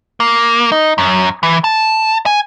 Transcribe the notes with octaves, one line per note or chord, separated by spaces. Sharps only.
A#3
D#4
F#2
E3
A5
G#5